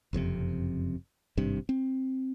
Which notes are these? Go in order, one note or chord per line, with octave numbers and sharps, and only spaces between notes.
F#1 F2 G#2 C3
G#1 G2 C3
C4